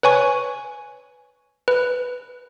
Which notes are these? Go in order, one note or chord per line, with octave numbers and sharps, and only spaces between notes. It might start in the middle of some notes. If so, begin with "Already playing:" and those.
B4 C#5 G#5 C#6
B4